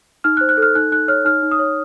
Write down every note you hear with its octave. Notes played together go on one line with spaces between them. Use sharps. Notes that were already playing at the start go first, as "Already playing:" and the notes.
D#4 F6
F#6
C5
F#6
A4
F6
D#4 F#6
D#4 F#6
C#5 F6
D#4 F6
D#4
D#6
C#5